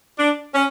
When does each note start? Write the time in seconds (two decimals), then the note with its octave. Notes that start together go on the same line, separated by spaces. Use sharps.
0.19 D4
0.54 C#4